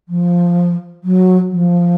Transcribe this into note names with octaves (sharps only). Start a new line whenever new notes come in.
F3
F#3
F3